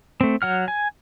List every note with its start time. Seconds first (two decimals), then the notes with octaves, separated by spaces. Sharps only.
0.21 A3 C4
0.42 F#3 F#5 F6
0.68 G#5